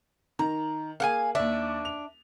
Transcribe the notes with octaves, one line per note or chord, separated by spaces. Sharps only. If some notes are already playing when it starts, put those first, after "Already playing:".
D#3 A#5
A#3 G#4 F5 F#5 G#5
D#2 D4 D5 E5
F7